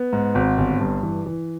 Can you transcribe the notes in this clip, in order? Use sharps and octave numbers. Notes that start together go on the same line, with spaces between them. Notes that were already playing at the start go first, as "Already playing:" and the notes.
Already playing: B3
G#2
G#1
G1
G2
E3
E3